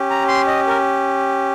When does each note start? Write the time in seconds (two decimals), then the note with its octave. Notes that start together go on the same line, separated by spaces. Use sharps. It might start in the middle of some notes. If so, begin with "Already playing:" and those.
Already playing: C#4 G4
0.10 A#5
0.28 C6
0.47 D#5
0.67 A#4